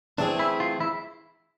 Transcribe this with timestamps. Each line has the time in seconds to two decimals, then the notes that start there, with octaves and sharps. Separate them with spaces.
0.18 E3 A3 C4 D4 G#4
0.39 E4
0.60 F4
0.80 E4